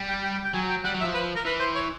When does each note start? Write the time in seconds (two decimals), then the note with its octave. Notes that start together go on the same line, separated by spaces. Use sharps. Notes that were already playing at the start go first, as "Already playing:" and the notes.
Already playing: G3
0.09 G5
0.23 G5
0.34 G5
0.45 G5
0.54 F#3 G#5
0.70 G5
0.85 G3 F#5
0.95 F#3
1.00 E5
1.04 F3
1.14 B4
1.36 A#4
1.45 E3 B4
1.60 C5
1.75 C#5